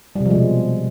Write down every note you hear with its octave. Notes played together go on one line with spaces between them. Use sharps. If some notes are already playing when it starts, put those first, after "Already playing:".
G3
C3
F3
G#3
B2